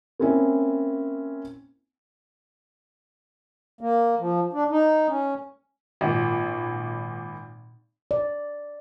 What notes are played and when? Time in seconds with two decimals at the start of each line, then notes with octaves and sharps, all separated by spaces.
0.20 A#3 C4 C#4 E4
3.81 A#3
4.20 F3
4.53 D4
4.71 D#4
5.08 C#4
6.01 G#1 A#2
8.11 D5